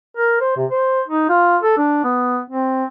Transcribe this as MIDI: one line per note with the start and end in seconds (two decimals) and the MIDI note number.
0.17 0.36 70
0.41 0.56 72
0.57 0.66 48
0.71 1.02 72
1.08 1.28 63
1.29 1.57 65
1.63 1.75 69
1.77 2.01 62
2.04 2.40 59
2.50 2.85 60